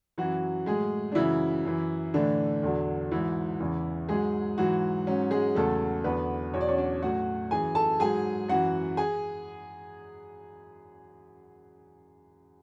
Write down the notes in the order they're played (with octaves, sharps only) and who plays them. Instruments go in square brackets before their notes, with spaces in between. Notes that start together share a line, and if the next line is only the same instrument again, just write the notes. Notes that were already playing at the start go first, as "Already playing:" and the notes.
[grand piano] F#2 E3 F#3 F#4
A2 F#3 G#3 G#4
D4
F#2 C#3 E3 F#3 E4
F#2 E3
A2 D3 E3 D4
E2 D3 F#3
G#2 E3 F#3 E4
E2 C#3 E3
G#2 F#3 G#3 G#4
G#2 E3 F#3 F#4
G#2 F#3 C#4
G#3 G#4
E2 C#3 F#3 A3 A4
E2 D3 F#3 B3 B4
E2 B2 F#3 C#5
D5
C#4 C#5
D4 D5
A2 F#3 F#4 F#5
F#2 E3 G#4 G#5
A4 A5
G#2 F#3 G#4 G#5
F#2 E3 F#4 F#5
G#4 G#5